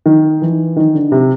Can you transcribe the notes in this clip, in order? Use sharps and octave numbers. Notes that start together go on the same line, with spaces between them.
D#3
E3
D#3
D3
C3